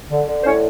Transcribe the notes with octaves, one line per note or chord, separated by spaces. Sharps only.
D3
D3
C5
A2 C#4 C#5